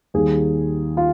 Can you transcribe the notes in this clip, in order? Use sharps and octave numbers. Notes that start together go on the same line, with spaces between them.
D#2 D#3 G3 G#4
F4